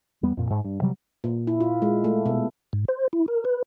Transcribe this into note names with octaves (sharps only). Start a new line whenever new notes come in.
E2 G3 B3
F2 A#2
G#2
G2
C3 F#3 G3
A#2
E4
F4
G#3
A3
B2
G#2
C5
E4
A#4
B4